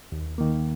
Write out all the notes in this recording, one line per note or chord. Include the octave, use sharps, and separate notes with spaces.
D#2
D#3 A#3